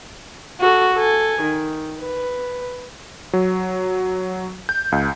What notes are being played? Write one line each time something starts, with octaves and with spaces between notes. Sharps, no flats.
F#4 A4
A4 G#5
D#3
B4
F#3
G6
C#2